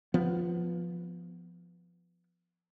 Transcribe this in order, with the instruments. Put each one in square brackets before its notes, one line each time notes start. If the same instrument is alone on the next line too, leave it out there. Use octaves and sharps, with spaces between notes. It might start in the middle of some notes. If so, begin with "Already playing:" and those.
[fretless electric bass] F3 B3